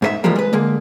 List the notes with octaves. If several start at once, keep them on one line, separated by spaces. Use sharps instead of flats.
G#2 A#4 E5
E3 F3 G3 G#3 A#3
G#3 B4
D3 G#3 A#3